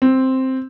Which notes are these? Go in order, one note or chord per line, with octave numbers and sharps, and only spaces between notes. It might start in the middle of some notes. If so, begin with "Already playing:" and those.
C4